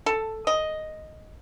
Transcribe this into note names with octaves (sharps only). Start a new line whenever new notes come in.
A4
D#5